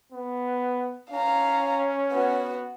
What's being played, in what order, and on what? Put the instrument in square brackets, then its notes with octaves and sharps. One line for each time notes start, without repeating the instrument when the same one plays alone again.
[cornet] B3
[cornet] C#4 [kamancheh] F5 A#5
[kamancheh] B3 F#4